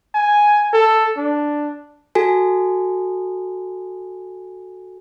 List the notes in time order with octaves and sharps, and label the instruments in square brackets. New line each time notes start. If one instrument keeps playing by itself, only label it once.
[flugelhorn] G#5
A4
D4
[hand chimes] F#4 A4 G#5